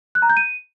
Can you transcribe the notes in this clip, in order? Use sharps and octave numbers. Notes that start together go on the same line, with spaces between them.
F#6
A#5
G6
D#7